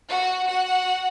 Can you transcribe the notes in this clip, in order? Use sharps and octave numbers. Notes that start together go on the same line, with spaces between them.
F#4 F#5
F#4 F#5